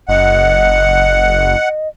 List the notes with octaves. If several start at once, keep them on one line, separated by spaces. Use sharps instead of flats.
F#1 D#5 F#5